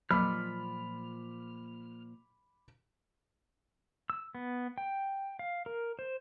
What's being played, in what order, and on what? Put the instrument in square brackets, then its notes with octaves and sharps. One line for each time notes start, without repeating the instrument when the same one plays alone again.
[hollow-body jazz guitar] A#2 F3 [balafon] F#3 [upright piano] B5 D6 [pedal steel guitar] F6
[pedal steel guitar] E6
B3
G5
F5
A#4
C5